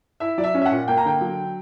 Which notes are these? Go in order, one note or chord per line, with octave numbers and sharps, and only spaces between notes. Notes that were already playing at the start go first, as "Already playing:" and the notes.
E4 E5
F#3 D5
E5
C#4
E5
F#5
A#2
A#3 G5
A#5
D3 G5
F#3